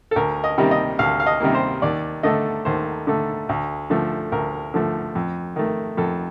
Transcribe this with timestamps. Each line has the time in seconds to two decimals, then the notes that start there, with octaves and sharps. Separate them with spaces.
0.11 A4
0.16 D2 A#4
0.44 D#5
0.58 C3 D#3 G3 A#3
0.71 D#5
0.99 D2 F5
1.20 F5
1.26 D#5
1.40 C3 D#3 G3 A#3
1.54 C5
1.82 D#2 D5
2.23 D3 A3 D#5
2.65 D#2 C5
3.07 D3 A3
3.49 D2
3.90 D3 F3 A3
4.32 D2 A#4
4.74 D3 F3 A3
5.15 F2
5.56 D#3 A3
5.97 F2 A4